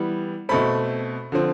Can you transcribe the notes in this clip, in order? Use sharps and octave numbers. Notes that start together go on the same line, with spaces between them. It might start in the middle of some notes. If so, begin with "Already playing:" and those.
Already playing: E3 G3 B3
B2 A3 C4 B5
D3 F3 C4